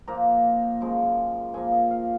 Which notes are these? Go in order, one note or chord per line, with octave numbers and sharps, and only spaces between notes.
A#2 F3 A#3 A#5
F#2 F3 G#3
A#2 F3 A#3 G#5
D#5
F5